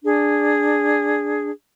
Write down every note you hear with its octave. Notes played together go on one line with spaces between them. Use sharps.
D4 G#4